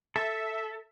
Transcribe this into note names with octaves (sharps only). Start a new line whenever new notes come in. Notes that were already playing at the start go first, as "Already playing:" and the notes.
A4 E5